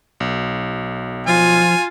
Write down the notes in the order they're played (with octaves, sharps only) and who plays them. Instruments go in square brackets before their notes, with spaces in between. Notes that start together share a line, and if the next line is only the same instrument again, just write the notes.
[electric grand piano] B1
[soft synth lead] F3 [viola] F4 [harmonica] G#5